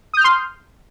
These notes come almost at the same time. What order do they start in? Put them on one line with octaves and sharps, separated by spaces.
D#6 G6 F6 C6